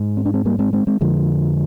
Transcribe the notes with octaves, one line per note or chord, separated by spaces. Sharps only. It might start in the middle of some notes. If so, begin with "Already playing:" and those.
Already playing: G#2
C4
D4
G#3 C4
G3 A#3
G#3 C4
G#3 C4
G#3 C4
F2 D3 F3 G#3